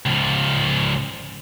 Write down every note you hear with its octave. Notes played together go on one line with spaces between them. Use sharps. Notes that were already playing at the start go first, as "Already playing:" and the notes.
C#2 F3